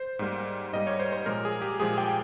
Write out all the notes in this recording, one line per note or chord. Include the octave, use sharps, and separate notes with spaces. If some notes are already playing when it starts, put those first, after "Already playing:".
Already playing: C5
G#2 G3 A#3
G#2 G3 A#3 D#5
C#5
C5
C5
A#2 F3 G#3 A#4
G#4
G4
A#2 F3 G#3 G#4
G5